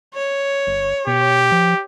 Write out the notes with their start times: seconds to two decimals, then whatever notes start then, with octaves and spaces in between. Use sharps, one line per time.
0.14 C#5
0.67 G1
1.07 B2 G4
1.52 F3